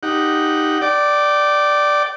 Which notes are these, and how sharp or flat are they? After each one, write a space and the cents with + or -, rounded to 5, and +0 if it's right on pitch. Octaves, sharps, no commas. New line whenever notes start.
D#4 +0 G4 +0 F#5 +0
D5 +0 G5 -30